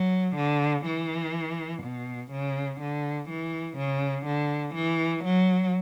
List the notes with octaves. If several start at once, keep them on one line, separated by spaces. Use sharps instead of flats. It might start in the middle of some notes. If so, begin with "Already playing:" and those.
Already playing: F#3
D3
E3
B2
C#3
D3
E3
C#3
D3
E3
F#3